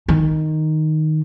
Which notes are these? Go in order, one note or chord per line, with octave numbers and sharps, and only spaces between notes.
D#3